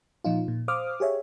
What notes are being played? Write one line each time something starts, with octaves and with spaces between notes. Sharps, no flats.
A#2 F3 D#4 F4
A#2
C5 F5 D6 D#6 F6
G4 G#4 C#5 E5